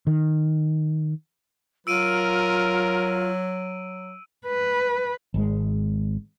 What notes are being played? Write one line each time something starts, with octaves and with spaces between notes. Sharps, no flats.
D#3
F#3 F4 A#4 E6 D7 D#7
B4
G#1 G#3